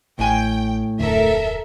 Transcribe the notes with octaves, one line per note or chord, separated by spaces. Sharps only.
A1 A2 G5 G#5
D1 F2 D3 A4 A#4 E5